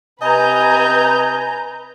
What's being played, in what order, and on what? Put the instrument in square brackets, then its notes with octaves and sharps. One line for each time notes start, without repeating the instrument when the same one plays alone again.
[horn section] C3 D#5 G#5 [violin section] B4 A#5 G6